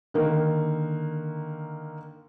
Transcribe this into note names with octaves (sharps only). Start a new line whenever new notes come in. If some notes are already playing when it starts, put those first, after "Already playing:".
D3 D#3 A#3